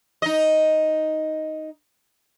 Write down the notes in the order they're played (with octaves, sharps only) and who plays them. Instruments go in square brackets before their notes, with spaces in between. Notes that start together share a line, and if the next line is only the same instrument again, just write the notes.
[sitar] D#4 D#5